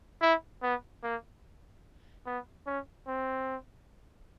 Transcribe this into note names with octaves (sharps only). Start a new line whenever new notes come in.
E4
B3
A#3
B3
C#4
C4